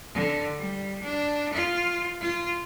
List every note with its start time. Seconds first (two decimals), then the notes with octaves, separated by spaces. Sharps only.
0.14 D3
0.59 G3
1.03 D4
1.53 F4
2.21 F4